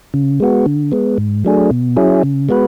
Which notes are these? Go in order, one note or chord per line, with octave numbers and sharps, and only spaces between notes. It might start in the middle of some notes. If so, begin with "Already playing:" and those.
C#3
G#3 B3 F#4
D3
G#3 B3
G#2
F#3 A3 D4 G#4
B2
F#3 C#4 E4 G#4
C#3
G#3 B3 F#4 B4